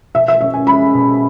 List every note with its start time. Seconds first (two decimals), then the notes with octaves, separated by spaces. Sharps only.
0.14 B2 E5
0.28 E5
0.41 C#4 E5
0.54 G#5
0.67 G#3 B5
0.94 B2